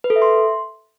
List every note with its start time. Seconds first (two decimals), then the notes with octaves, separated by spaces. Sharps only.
0.04 B4
0.10 A4
0.16 E5
0.22 C6